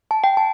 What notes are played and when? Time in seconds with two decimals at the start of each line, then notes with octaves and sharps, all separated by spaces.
0.11 A5
0.24 G5
0.37 A5